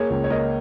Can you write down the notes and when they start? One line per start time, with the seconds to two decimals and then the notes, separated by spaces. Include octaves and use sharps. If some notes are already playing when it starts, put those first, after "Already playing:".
Already playing: A#3 G#4 C#5
0.10 C#2
0.24 C#5
0.30 A#3 A#4 D#5